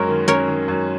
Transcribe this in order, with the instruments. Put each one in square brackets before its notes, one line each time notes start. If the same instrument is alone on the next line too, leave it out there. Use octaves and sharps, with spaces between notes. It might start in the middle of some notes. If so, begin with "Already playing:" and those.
Already playing: [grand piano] F#2 G#3 C#4 [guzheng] A#4 C#5
[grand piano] D#3
[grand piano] C#4 [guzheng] A#4 C#5
[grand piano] D#3
F#2